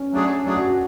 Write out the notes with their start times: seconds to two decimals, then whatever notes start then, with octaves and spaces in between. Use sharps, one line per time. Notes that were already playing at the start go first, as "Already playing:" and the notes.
Already playing: C#4
0.13 F#3 A3 D4 G#4
0.44 F#3 A3 D4 F#4 G#4
0.54 F#4
0.66 F#4